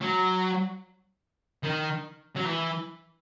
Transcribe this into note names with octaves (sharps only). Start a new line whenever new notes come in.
F#3
D#3
F#3
E3